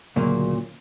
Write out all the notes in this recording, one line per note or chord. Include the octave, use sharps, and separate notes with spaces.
D2 A#2 C#3 F#3 A#3